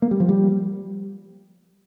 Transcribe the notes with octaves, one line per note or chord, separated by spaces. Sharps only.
A#3
G3
F3
G3